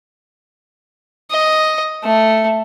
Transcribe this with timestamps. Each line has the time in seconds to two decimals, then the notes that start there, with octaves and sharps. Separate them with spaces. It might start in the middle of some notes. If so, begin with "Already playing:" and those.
1.31 D#5
2.04 A3